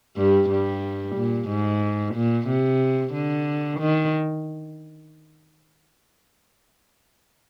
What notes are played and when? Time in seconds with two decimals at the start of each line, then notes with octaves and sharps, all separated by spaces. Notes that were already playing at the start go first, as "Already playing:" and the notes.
0.17 G2 G3
0.49 G2 G3
1.15 A#2
1.49 G#2
2.14 A#2
2.48 C3
3.13 D3
3.80 D#3